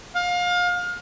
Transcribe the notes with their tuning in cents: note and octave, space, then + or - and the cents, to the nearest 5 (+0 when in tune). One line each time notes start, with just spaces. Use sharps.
F5 +30